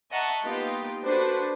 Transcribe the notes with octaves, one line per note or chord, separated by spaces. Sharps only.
D#5 E5 F#5 A5 A#5 C#6
A#3 B3 D#4 F4 G4
D4 F#4 A4 B4 C5